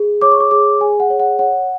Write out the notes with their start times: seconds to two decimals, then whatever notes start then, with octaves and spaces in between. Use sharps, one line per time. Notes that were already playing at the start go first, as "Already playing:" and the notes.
Already playing: G#4
0.22 C#5 D6
0.32 C#6
0.40 D6
0.51 G#4 D6
0.81 G#4 G#5
1.00 F#5
1.10 C#5
1.20 F#5
1.39 C#5 F#5